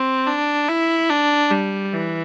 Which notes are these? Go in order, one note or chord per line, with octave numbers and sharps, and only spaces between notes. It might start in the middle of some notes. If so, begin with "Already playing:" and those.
Already playing: C4
D4
E4
D4
G3
E3